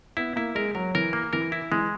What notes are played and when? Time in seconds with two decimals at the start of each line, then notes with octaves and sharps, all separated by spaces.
0.17 B3 E4
0.36 A#3 E4
0.55 G#3 A#4
0.75 F#3 A#4
0.95 E3 A#4
1.13 A#3
1.33 E3 A#4
1.52 E4
1.72 E3 G#3